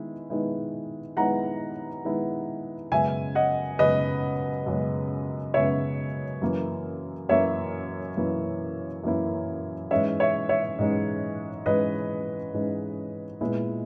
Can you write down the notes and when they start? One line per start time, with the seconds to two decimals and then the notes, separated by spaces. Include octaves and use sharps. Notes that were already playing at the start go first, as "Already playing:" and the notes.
Already playing: D#3 G#3 B3 E4
0.30 D#3 G#3 B3 E4
1.17 D#3 G#3 B3 E4 F#5 A#5
2.04 D#3 G#3 B3 E4
2.92 F#2 C#3 G#3 B3 E5 G#5
3.35 D#5 F#5
3.79 F#2 C#3 G#3 B3 B4 D#5
4.66 F#2 C#3 G#3 B3
5.54 F#2 C#3 G#3 B3 C#5 E5
6.42 F#2 E3 A#3 E4
7.29 F#2 E3 A#3 E4 C#5 E5
8.17 F#2 E3 A#3 E4
9.04 F#2 E3 A#3 E4
9.91 G#2 E3 G#3 C#4 C#5 E5
10.20 C#5 E5
10.49 C#5 E5
10.79 G#2 E3 G#3 C#4
11.66 G#2 E3 G#3 C#4 B4 D#5
12.54 G#2 E3 G#3 C#4
13.41 A#2 G#3 B3 E4